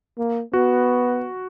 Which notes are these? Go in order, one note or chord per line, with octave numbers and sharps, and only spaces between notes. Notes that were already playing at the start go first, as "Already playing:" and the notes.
A#3
B3 F#4